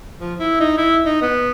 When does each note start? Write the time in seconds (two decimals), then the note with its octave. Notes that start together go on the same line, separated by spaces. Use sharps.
0.20 F3
0.39 E4
0.60 D#4
0.77 E4
1.06 D#4
1.21 B3